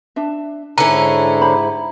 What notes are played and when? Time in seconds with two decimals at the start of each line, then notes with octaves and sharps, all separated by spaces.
0.16 D4 E5
0.78 G#2 D3 C#4 D#4 E4 B4 A#5
1.42 G4 C5 B5